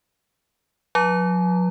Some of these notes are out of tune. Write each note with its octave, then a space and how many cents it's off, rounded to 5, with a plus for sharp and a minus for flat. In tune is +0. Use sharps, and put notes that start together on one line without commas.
F#3 -40 A#5 -35